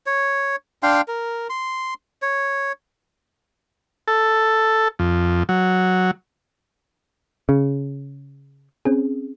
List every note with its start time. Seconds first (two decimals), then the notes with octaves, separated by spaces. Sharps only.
0.06 C#5
0.83 D4 F5 G5 C6
1.08 A#4
1.50 C6
2.22 C#5
4.08 A4
4.99 F2
5.49 F#3
7.49 C#3
8.85 C4 C#4 G#4